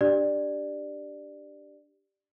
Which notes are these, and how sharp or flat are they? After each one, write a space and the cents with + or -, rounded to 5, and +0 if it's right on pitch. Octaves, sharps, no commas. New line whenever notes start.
D4 -5 G4 +0 D5 +10